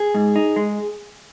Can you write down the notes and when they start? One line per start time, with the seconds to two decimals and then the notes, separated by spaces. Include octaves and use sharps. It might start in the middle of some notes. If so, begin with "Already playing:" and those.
Already playing: G#4
0.14 G#2
0.36 D#4
0.56 G#3